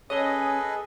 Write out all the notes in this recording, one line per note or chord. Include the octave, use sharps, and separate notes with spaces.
C#4 G#4 A4 B4 C#5 D#5
G#5